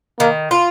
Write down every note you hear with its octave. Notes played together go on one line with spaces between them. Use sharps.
D#3 A#3
F4